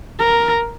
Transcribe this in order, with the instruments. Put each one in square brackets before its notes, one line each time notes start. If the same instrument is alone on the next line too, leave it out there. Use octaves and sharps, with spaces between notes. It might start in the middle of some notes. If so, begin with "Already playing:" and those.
[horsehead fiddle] A#4